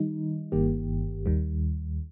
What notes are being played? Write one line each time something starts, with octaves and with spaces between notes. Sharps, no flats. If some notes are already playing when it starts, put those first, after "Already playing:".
Already playing: D#3 G3 D#4
G1 G2 D#3 A#3 G4
D#2 D#3 G3